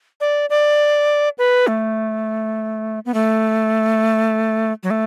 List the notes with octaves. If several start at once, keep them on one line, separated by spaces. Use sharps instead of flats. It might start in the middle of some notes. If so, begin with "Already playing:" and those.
D5
D5
B4
A3
B3
A3
F#3
A3